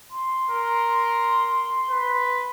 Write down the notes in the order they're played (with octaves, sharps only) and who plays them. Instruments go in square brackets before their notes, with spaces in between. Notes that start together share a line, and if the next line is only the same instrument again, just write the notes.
[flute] C6
[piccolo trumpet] A#4
B4